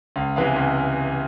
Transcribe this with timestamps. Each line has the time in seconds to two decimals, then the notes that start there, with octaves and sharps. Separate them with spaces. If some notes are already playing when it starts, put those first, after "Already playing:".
0.16 C#2 F5
0.36 C3 E3 G#3 B3 F5
0.56 C#2